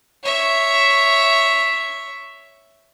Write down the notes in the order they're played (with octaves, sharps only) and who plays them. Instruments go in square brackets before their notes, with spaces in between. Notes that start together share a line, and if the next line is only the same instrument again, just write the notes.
[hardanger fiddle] C#5 E5